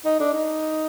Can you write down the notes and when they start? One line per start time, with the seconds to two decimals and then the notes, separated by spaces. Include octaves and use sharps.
0.05 D#4
0.20 D4
0.34 D#4